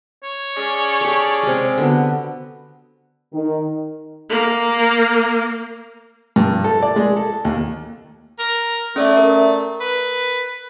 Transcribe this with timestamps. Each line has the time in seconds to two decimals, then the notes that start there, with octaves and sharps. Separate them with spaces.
0.23 C#5
0.57 C#4 G#4 D5
1.01 G4 A4
1.43 C3 G#3
1.78 D3 B3 F#4
3.33 D#3
4.30 A#3
6.36 G2
6.64 A4
6.82 D5
6.96 G#3
7.17 A4
7.45 D#2
8.39 A#4
8.96 A3 C#4 D5 E5
9.17 A#4
9.81 B4